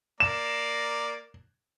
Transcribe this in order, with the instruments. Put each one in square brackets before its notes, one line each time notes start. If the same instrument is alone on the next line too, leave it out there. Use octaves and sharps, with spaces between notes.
[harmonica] A#3 D5 A#5 [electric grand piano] E7